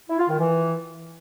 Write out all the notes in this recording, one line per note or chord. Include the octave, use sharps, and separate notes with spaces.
E4
F4
D#3
E3